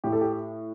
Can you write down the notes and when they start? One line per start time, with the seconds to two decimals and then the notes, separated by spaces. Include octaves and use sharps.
0.04 A2 G4
0.12 A4
0.21 G4